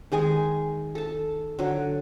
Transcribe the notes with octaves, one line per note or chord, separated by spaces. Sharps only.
D#3 G#3 G#4 G#5
A4 A5
D3 F#3